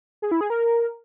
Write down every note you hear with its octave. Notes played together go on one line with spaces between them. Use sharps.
G#4
E4
G#4
A#4